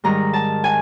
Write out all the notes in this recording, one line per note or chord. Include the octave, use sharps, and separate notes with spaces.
G#2 D#3 G3 A#5
A5
G#5